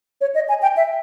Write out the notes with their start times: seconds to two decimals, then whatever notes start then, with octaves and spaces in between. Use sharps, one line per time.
0.21 C#5
0.35 D#5
0.49 G#5
0.62 G5
0.77 E5